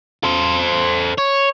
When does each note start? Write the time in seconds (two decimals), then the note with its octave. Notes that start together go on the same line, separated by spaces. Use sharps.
0.24 A4 C5
1.19 C#5